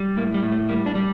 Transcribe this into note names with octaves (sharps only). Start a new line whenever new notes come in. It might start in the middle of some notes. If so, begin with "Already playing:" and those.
Already playing: G3
A2 A#3
G3
A2
A3
G3 A#3
D4
G3